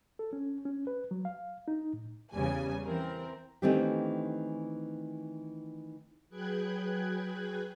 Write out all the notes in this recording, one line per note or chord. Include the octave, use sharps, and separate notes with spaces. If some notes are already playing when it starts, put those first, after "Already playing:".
A4
C#4
C#4
B4
F#3
F5
D#4
A2
E2 C#3 G3 G#5
E3 C4 A#4
D#3 E3 A3 C4 D4 G4
F#3 G#4 B4 G5 F#6 G#6